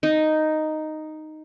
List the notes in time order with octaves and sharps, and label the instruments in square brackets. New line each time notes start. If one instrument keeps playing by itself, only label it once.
[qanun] D#4